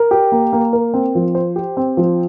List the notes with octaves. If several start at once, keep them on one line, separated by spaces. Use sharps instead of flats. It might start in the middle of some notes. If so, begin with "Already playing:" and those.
Already playing: A#4
G4
A#3
A#3
A#4
C4
F3
C5
G4
C4
F3